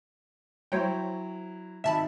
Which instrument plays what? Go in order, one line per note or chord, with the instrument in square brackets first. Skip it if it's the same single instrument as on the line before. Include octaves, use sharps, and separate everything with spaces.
[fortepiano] F#3 E4 [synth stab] C5 C#5 G5
[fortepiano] G#1 [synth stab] E5 A5 B5